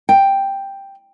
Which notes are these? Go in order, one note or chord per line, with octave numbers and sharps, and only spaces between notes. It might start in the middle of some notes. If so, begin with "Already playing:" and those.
G5